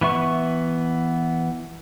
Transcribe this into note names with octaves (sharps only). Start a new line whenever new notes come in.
E3 B3 E5 C#6